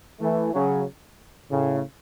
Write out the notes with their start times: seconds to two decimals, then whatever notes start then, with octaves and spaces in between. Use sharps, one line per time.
0.20 E3 A3
0.52 C#3 F#3
1.50 A2 C#3